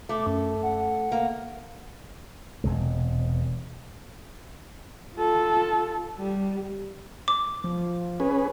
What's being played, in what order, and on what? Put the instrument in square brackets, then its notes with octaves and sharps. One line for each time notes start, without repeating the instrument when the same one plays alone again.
[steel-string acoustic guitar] A3 [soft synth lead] D6
[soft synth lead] F#2
F#5
[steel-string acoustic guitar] A#3
[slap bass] E1 C3 G#3
[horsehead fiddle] F4 A4
G3
[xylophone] D6
[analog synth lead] F3
[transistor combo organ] C#4 G#4 B4